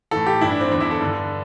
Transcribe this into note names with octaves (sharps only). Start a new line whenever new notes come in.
A2 E3 A4
G4
G2 E3 E4
D4
C4
E2 D3 D4
E4
A4
G2 D3